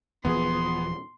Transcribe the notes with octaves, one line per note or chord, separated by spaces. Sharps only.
D#1 E3 F3 B3 G#4 C6